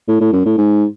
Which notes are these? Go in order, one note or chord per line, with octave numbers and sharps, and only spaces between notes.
A2
A2
F#2
A2
G#2